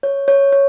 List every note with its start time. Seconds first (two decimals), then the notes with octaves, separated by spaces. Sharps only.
0.03 C#5
0.28 C#5
0.52 C#5